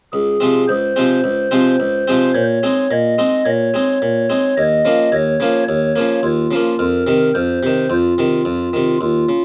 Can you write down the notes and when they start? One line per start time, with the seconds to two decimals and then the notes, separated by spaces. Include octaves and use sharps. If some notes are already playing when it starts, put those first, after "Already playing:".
0.13 C#2 G#4
0.40 C3 F3 G#3 C4
0.68 C#2 C5
0.96 C3 F3 G#3 C4
1.24 C#2
1.51 C3 F3 G#3 C4
1.80 C#2
2.08 C3 F3 G#3 C4
2.34 A#2 C#5
2.63 G#3 C4 D#4
2.91 A#2 D#5
3.18 G#3 C4 D#4
3.45 A#2 C#5
3.74 G#3 C4 D#4
4.02 A#2
4.30 G#3 C4 D#4
4.57 D#2 D#5
4.85 C#3 F3 A#3
5.12 D#2 C#5
5.40 C#3 F3 A#3
5.68 D#2 C#5
5.96 C#3 F3 A#3
6.23 D#2 F4
6.51 C#3 F3 A#3
6.79 F2 A#4
7.07 C3 D#3
7.35 F2 C5
7.63 C3 D#3
7.90 F2 F4
8.18 C3 D#3
8.45 F2
8.73 C3 D#3
9.01 D#2 F4
9.29 C#3